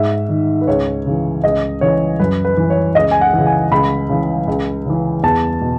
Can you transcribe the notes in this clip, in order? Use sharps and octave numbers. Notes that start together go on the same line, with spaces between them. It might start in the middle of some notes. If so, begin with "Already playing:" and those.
Already playing: G#2 E5
D#3
B4
C#2 C#5
C#3 E3
C#2 D#5
C#3 E3 C#5
F#2 B4
B4
E3
C#5
C#2 D#5
G#5
F#5
C#3 E3
G#5
C#2 B5
C#3 E3
C#2
C#3 E3
E2 A5
B2